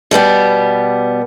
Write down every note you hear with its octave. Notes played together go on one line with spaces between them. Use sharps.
B2 G3 B3 G4